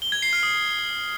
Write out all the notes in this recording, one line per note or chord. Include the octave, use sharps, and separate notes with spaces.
G7
G#6
C7
F6
D#6